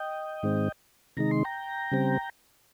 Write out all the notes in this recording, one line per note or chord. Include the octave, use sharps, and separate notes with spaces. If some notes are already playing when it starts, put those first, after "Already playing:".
Already playing: D#5 G5
G#2 D#3 G#3 C4
C3 D#3 G#3 D#4 A#5
C6
G5 A#5
C#3 G3 C4